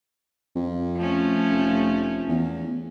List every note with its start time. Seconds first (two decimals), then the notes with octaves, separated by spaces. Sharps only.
0.55 F2
0.97 F3 A3 C#4
1.51 F1
2.28 E2